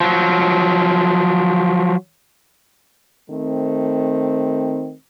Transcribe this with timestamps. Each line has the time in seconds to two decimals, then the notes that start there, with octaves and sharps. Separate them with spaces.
0.01 F3 F#3
3.31 D#3 A3 C4